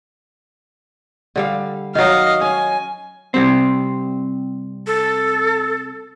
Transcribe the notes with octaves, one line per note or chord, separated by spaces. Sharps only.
D3 G3 F5
D#3 F#3 D#5 F5
C#4 G#5
C3 G3 C4
A4